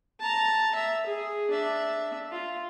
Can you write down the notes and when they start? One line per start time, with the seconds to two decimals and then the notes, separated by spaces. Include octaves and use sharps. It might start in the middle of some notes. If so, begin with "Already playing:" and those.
0.20 A5 A#5
0.75 E5
1.06 G#4
1.50 D4 E5
2.31 F4